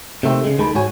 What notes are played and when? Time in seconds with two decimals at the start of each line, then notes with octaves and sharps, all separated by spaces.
0.23 C3 D#3 A3 C4
0.44 C#3 G#3
0.58 D2 D#3 G#3 A4 B5
0.75 G#2 F#4 C#5 G#5